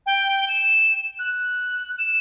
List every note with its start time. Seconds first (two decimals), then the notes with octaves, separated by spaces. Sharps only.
0.06 G5
0.48 E7
1.19 F#6
1.98 E7